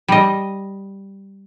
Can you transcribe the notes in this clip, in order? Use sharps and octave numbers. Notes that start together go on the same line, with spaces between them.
G3 D#5